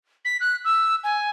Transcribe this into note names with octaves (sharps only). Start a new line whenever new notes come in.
B6
F#6
E6
G#5